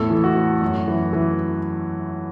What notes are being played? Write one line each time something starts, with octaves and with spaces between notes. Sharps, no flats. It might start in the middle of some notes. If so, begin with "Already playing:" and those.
Already playing: E2 A2 A4
E3
F#4
A2
F#2
E3
E3